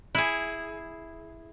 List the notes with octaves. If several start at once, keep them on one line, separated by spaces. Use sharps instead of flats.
E4 G#4